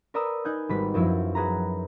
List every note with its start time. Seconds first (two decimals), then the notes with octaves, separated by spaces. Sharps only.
0.14 A#4 B4 D5 A#5 D#6 E6
0.45 D#4 G#5 F#6 G6
0.69 G#1 G3 B4 B6
0.94 F#2 F3 F#3 E4
1.35 F#4 G#4 B4 A#5